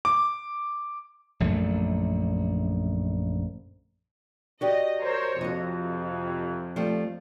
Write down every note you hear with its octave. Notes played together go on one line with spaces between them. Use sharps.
D6
A#1 F#2 D3 A3
F#4 G4 D5 D#5
A#4 C5 C#5
F2 C3 F#4 D#5
F3 G3 A3